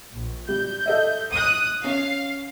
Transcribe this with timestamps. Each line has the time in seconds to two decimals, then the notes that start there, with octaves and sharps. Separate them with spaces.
0.13 A#1
0.48 G3 G6
0.86 A4 D#5 E5
1.33 D#6 F#6
1.84 C#4 F5